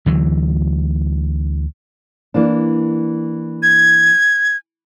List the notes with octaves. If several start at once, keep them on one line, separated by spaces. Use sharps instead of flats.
D2 E3 F#3
E3 A#3 D4
G#6